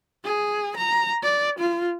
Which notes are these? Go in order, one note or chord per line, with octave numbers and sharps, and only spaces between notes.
G#4
A#5
D5
F4